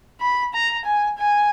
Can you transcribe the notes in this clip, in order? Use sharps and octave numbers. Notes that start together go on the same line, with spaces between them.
B5
A#5
G#5
G#5